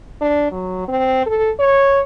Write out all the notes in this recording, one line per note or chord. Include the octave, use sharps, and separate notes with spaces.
D4
F#3
C4
A4
C#5